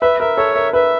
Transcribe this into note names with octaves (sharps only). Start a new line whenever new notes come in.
B4 E5
A#4 E5
A4 C#5
A#4 E5
B4 E5